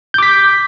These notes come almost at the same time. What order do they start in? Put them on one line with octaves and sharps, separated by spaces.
G6 D6 B6